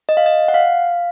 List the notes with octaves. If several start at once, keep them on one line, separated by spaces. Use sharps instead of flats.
D#5
F5
D#5
F#5
F5